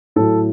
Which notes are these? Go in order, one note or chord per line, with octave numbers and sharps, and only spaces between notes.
A2 F#3 A4